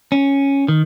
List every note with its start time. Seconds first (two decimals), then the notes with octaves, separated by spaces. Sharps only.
0.12 C#4
0.68 D#3